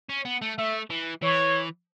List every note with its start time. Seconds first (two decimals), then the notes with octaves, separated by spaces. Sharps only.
0.09 C#4
0.25 B3
0.42 A3
0.58 A3 E5
0.90 E3
1.23 E3 C#5